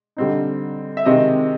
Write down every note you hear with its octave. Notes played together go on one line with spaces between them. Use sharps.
D3 G3 C4 D#4
E5
C3 D#3 G#3 C4 D#5